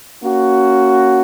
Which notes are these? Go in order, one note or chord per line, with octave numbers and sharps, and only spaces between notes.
A#3 C#4 F#4